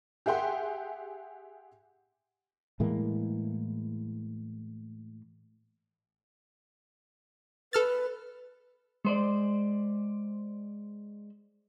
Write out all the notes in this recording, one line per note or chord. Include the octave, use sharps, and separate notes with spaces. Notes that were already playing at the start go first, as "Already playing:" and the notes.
G4 G#4 E5 F#5 G5 C6
A2 E3 G#3 A#3
A4 B4 F6 A6
G#3 C5 D5